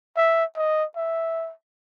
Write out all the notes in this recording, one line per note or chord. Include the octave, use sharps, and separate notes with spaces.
E5
D#5
E5